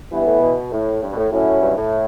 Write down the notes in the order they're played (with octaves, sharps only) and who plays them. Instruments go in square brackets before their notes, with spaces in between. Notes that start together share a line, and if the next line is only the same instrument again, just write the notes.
[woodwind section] G2 [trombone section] E3 B3 E4
[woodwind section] A2
B2
A2
G2
B2
A2
[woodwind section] A2 [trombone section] F#3 C#4 E4
[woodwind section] G2
A2